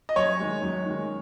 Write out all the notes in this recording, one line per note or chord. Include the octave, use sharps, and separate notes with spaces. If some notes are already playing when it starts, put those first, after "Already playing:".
D#5
F#2 C#5
D#3 G#3
F#2
D#3 G#3